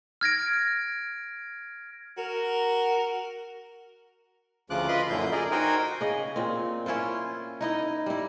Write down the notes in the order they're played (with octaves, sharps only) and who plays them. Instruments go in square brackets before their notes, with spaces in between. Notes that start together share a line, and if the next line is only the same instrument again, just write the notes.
[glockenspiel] F6 G#6 A#6 D7
[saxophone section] F#4 A#4
[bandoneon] D2 C#3 F3 F4 D6 F#6
F4 B4 D#5 B5 C6
F#2 A#2 D3 E4 G6
G#4 A#4 D5 D#5
D#4 F#4 A#4 C5 G5 G#5
[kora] C#3 G#4 D#5
A#2 C4
C#4 E4 F4 C5
D#4 E4 D#5
G3 E4